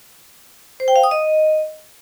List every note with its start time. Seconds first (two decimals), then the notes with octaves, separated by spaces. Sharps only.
0.80 C5
0.88 G5
0.96 F5
1.03 D#6
1.11 D#5